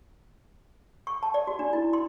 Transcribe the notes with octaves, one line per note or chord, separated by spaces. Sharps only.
C#6
A5
D5
F#4
D4
E4
C6